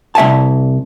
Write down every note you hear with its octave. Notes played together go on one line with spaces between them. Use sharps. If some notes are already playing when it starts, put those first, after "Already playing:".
C2 E5 G#5 A5